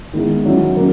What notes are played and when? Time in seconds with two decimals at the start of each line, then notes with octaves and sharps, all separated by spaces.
0.13 D#3 G#3 B3 E4
0.45 D#3 F#3 C#4 E4
0.76 C#3 F#3 A#3